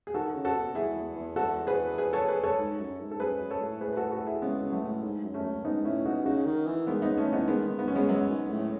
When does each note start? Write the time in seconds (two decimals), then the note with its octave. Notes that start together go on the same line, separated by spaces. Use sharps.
0.07 G#4
0.14 D#3 F#4 A4
0.34 C#3
0.45 F#4 A4
0.55 B2
0.75 E2 E4 G#4
0.96 E2
1.16 E2
1.36 F#4 A4
1.67 G#4 B4
1.98 G#4 B4
2.13 A4 C#5
2.28 G#4 B4
2.43 A4 C#5
2.59 G#2
2.79 F#2
2.99 G#2
3.11 A4
3.20 F#2 G#4 B4
3.41 F#2
3.50 A4 C#5
3.61 A2
3.81 G#4 B4
3.93 B4
3.97 F#4 A4
4.12 F#4 A4
4.27 E4 G#4
4.42 C#3 G#3 B3
4.63 C#3
4.72 F#3 A3
4.83 A2
5.03 G#2
5.23 F#2
5.34 E2 A3 C#4
5.44 F#2
5.65 G#2 B3 D#4
5.85 A2 C#4 E4
6.05 B2 D#4 F#4
6.26 C#3 D#4 F#4
6.46 D#3
6.66 E3
6.87 D#3 G#3 B3
7.02 C#3 B3 D#4
7.18 A3 C#4
7.27 E3
7.33 B3 D#4
7.48 D#3 G#3 B3
7.69 D#3
7.79 B3
7.88 F#2 C#4
7.95 G#3 B3
8.09 F#2 F#3
8.30 G#2
8.50 A2